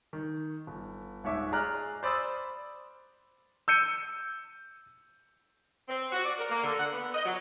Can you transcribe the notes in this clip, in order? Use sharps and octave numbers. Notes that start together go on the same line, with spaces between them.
D#3
G1
D#1 G#2 C#5 E5 D6
G#4 D5 D#5 A#5 F6 F#6
C5 D5 B5 D#6 E6 A6
E6 G6 C#7 D#7
C4
F#4
D5
A#4
A#3
D3
F#5
B3
D#5
F#3